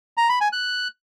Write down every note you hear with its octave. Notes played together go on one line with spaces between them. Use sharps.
A#5
B5
G#5
F#6